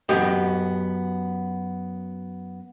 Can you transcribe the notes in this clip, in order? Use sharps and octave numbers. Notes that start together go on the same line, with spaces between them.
F#2 B3 G4 D#5